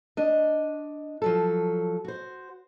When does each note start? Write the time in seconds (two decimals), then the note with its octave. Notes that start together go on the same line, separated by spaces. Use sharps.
0.17 D4 D#5
1.22 F3 F#3 A4
2.05 F#4 C5